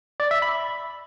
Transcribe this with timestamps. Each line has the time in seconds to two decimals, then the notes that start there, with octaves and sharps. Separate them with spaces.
0.20 D5
0.31 E5
0.42 B5